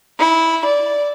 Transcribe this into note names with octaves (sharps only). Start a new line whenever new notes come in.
E4
D5